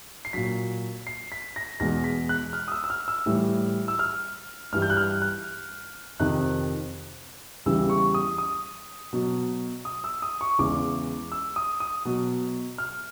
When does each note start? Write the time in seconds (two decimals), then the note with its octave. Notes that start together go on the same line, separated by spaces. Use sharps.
0.25 C7
0.33 A#2 F#3 B6
1.07 C7
1.32 B6
1.56 A#6
1.80 E2 B2 G#3 A#6
2.04 B6
2.29 F#6
2.53 F6
2.68 D#6
2.72 E6
2.84 E6
2.90 F6
3.08 E6
3.26 A2 E3 G3
3.88 E6
3.99 F6
4.73 G2 E3 G3 F6
4.82 G6
4.90 F#6
4.97 F6
5.22 F#6
6.20 F2 C3 D#3 F#6
7.66 E2 C#3 E3 G3 E6
7.90 C#6
8.14 D#6
8.38 D#6
9.13 B2 F#3
9.85 D#6
10.04 E6
10.22 D#6
10.41 C#6
10.59 E2 C#3 E3 G#3 D6
11.32 E6
11.56 D#6
11.80 D#6
12.05 B2 F#3
12.78 F6